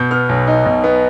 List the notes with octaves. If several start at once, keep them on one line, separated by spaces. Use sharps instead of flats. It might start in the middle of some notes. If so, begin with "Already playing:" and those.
Already playing: B2 G6
B3 F6
B1
D#4
B2
B3